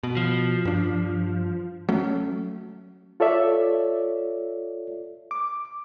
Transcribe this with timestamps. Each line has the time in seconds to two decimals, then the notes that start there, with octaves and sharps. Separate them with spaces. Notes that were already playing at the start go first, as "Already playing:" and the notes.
0.03 B2
0.17 F3
0.65 G2 D4
1.89 F#3 A3 C#4
3.20 F4 A4 C#5 D5 E5
5.31 D6